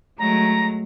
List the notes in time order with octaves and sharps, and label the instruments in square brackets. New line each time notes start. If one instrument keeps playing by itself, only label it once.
[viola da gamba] F#3 G#3 A3 [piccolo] A#5